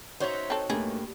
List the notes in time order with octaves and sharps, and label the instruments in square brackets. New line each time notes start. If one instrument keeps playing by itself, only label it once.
[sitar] D#4 F#4 C#5 [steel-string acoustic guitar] C5 E5
[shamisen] C4 A4
[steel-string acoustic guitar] G2 [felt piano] A3 A#3 [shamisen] G#4